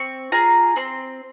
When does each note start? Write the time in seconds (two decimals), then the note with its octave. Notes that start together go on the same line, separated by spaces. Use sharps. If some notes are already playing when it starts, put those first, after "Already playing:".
Already playing: C4 C#6
0.32 F4 G#4 A#5
0.76 C4 C6